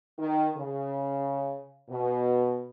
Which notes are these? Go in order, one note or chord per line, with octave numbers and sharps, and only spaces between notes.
D#3
C#3
B2